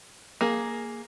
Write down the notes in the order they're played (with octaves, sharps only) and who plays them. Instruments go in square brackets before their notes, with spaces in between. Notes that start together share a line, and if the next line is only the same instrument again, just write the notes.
[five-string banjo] A#3 G#4